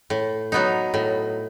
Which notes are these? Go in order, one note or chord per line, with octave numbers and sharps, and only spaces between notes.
A2
F#3 B3 D#4
A2